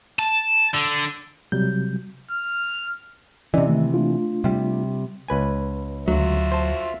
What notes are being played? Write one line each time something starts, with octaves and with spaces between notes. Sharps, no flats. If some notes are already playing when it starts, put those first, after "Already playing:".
A5
D3
C3 F#3 G3 G6
F6
C3 E3 C#4 D5 D#5
D#3 A3
A3 D4 F4
C3 G3
C#2 B4 G#5
D2 F#3 F4 F#4 E5
C5 A5